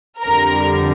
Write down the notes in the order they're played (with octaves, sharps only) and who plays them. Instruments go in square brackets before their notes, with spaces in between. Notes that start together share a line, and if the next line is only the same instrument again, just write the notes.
[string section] F2 D3 G3 A#4